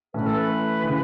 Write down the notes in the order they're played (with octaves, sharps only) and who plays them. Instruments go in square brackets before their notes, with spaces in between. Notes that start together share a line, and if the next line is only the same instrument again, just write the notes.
[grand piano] A2 E3 A3 C#4 [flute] B4
[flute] A4
B4
[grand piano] C#3 E3